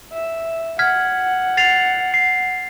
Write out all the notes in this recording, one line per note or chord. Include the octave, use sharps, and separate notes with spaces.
E5
F#5 F6 G#6 B6
A6 C7 F7
C7